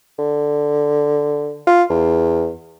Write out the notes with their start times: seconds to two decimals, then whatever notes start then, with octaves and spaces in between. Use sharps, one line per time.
0.18 D3
1.67 F4
1.90 E2